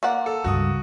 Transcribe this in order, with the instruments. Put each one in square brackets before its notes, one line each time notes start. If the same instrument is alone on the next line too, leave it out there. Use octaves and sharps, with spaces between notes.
[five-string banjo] A#3 D5 F#5
[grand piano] A4
[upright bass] C#2 G2 [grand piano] F#4 D#6